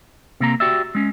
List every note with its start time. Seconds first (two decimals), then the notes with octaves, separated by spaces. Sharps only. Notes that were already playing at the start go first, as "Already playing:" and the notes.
0.40 C3 A#3 A#5
0.60 F#4 G4 D5 E5
0.95 G#3 C#4